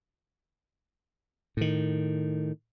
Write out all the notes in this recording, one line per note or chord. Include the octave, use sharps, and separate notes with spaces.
A2 D#3